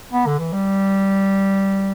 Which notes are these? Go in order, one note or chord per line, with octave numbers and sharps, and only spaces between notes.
B3
D3
E3
G3